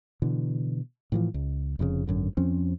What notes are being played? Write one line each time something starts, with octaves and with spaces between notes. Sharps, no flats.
B2 D3 E3
A2 E3 F3
C#2
F1 F2 A2 C#3
G#1 F#2 D3
F2 F3 C4 C#4